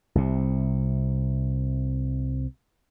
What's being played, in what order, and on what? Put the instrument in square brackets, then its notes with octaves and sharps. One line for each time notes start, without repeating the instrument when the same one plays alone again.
[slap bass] C2 C3